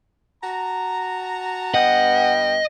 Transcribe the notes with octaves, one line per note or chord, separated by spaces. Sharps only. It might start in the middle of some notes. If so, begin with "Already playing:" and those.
F#4 A5 A#5
G2 B3 D#5 F#5 G5